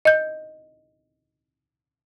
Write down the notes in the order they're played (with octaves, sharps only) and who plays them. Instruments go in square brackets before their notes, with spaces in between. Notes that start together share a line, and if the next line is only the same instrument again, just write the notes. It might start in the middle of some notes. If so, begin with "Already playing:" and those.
[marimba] D#5 G6